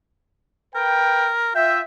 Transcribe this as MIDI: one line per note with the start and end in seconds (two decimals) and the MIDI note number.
0.75 1.51 70
0.75 1.31 71
0.75 1.31 79
1.55 1.81 65
1.55 1.81 76
1.55 1.79 79